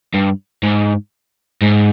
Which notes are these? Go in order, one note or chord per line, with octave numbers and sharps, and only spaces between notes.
G2
G#2
G#2